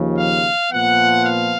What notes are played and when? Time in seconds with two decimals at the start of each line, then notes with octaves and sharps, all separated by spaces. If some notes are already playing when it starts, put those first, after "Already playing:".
Already playing: D#2 C#3 F3
0.17 F5
0.71 A#2 F3 B3 F#5
1.26 F5